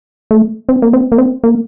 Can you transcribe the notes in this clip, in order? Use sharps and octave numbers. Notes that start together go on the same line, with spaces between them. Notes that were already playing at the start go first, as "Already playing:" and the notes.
A3
C4
A#3
C4
A#3
C4
A#3